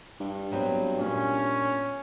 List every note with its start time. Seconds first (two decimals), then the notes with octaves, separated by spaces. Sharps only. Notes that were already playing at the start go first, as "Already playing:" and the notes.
0.20 G2
0.51 F#3 B3 C4
0.99 A#2 C#4